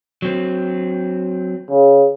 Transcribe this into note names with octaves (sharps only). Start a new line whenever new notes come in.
F#3 C4
C#3